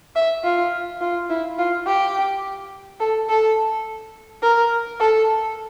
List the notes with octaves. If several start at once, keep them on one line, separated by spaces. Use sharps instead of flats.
E5
F4
F4
E4
F4
G4
A4
A4
A#4
A4